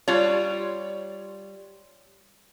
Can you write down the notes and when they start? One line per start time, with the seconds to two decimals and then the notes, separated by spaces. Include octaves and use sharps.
0.08 G3 F4 C#5